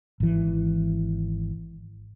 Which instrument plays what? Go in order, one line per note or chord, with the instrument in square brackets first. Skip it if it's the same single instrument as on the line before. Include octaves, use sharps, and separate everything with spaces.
[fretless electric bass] G#1 E3